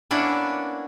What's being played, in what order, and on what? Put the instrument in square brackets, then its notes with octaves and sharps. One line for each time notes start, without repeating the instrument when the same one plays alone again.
[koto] A#3 B3 C#4 D4 E4